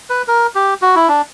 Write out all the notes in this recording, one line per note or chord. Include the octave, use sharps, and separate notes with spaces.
B4
A#4
G4
F#4
E4
D4